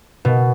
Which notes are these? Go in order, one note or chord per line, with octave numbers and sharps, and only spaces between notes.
B2